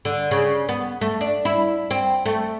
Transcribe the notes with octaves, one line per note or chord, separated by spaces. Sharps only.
D3
C#3
B3
A3
D4
E4
C4
A3